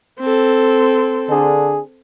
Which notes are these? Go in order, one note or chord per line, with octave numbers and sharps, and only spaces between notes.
C4 A4
D3 D4 G#4